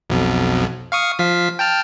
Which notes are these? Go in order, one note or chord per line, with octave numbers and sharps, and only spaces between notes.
B1 F2 B2
F5 C#6 D#6
F3 F5 B6
G5 A5 F6